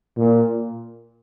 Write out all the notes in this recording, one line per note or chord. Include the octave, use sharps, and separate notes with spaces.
A#2